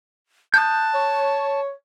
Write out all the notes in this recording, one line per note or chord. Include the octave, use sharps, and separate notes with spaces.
A5 D#6 F#6 G6
C#5